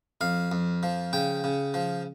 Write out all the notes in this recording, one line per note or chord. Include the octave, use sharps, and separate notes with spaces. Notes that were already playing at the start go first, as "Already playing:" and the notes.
F2 F5
F2
F3
C#3 G5
C#3
F3